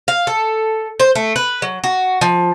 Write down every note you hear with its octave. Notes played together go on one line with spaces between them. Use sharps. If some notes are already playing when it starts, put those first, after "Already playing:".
F5
A4
C5
A3
B4
F#3
F#4
F3